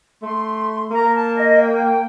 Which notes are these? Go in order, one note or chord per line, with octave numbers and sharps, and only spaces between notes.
A3 C6
A#3 A#5
A5
D#5
G5